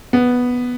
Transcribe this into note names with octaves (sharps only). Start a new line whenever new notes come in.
B3